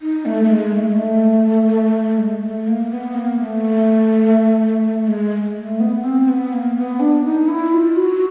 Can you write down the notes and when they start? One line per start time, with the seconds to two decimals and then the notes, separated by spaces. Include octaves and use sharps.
0.01 D#4
0.25 A3
0.44 A3
0.50 G#3
0.74 A3
0.82 G#3
0.92 A3
2.18 G#3
2.42 A3
2.67 A#3
2.90 B3
3.15 A#3
3.39 A3
5.07 G#3
5.56 A3
5.80 B3
6.04 C4
6.28 B3
6.52 A#3
6.77 B3
7.00 D4
7.24 D#4
7.48 E4
7.73 F4
7.96 F#4